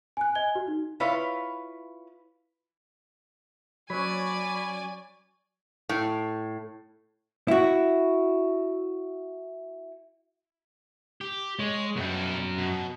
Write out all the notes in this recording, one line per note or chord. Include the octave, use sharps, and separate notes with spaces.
G#5 F#6
D#5 G#5 G#6 G7
F#4
D#4
E4 F4 B4 C#5 F5
F#3 C#4 C#5 D5 G#5 B5
A2
E4 F#4
G4
G#3 C#5
F#2 B2 F#3 G3
B2